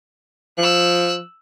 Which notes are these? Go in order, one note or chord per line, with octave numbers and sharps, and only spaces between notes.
F3 E6 F#6